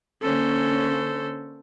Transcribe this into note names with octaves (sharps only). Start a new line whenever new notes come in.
D3 A#3 C#4 A4 C5